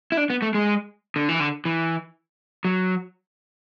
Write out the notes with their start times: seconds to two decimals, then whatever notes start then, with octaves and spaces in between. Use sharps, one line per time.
0.12 E4
0.17 D4
0.30 B3
0.42 A3
0.54 G#3
1.16 D3
1.29 E3
1.40 D3
1.65 E3
2.65 F#3